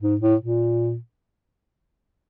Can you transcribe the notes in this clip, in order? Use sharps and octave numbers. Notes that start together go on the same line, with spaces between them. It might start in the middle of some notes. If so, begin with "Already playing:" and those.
G#2
A2
A#2